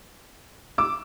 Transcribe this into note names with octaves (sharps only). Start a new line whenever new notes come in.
D6 E6